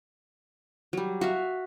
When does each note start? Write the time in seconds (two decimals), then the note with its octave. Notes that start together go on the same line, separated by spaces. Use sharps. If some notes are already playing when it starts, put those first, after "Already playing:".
0.93 F#3 G3
1.21 F#4 E5 F5